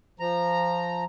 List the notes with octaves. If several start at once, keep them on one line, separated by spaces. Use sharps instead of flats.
F3 A#5